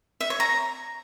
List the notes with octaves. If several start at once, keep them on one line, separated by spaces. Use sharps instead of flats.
E5
C#5
A#5